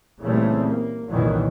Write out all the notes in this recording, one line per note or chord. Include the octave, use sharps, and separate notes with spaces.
A#2 C#3 E3 G3 A3 C4
A#3
C2 F2 A#2 D#3 E3 F#3